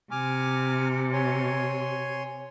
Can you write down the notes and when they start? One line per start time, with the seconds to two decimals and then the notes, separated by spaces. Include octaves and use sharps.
0.11 C3 G#5 D6 F6
1.13 C#5 G#5 C6